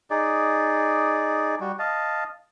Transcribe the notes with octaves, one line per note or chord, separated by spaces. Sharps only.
D#4 G#4 D5
G3 F#4
D#5 F5 A5